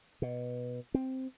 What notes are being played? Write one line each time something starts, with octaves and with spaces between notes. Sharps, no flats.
B2
C4